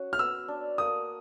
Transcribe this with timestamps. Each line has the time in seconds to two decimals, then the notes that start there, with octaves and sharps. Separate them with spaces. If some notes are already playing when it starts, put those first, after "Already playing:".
Already playing: C#4 F#4
0.13 F6
0.19 B3 E6
0.48 D4
0.78 A#3 D#6